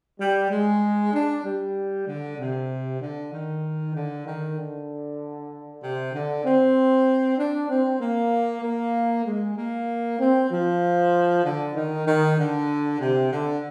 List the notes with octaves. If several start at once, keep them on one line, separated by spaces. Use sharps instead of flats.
G3
G#3
D4
G3
D3
C3
D3
D#3
D3
D#3
D3
C3
D3
C4
D4
C4
A#3
A#3
G#3
A#3
C4
F3
D3
D#3
D#3
D3
C3
D3